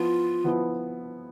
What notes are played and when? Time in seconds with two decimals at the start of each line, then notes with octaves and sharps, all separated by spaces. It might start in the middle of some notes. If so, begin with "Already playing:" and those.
Already playing: F3 B3 E4 F4
0.44 F3 B3 E4